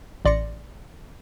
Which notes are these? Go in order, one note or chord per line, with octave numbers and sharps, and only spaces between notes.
A1 D5 C6 A#6 C#7